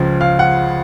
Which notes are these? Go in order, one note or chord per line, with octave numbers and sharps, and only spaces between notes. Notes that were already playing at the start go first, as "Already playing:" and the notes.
Already playing: C#2 C#3 F3
F5
F#5